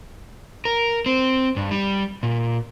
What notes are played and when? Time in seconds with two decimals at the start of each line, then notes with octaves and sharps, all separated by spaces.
0.65 A#4
1.06 C4
1.56 G2
1.71 G3
2.23 A#2